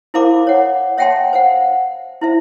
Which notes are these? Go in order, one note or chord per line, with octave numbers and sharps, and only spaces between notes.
E4 A#4 C5 F5 B5 D6
C#5 F#5
C#5 E5 F#5 G5 A5 C6
C5 F5 F#5
E4 C5 E5